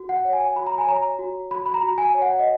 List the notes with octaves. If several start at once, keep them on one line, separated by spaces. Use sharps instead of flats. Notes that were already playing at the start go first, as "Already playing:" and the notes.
Already playing: F#4
F#5
C#5
G#5
F#4 B5
A#5
G#5
C#5 A#5
F#4
F#4 B5
B5
A#5
F#4
G#5
C#5
F#5
D#5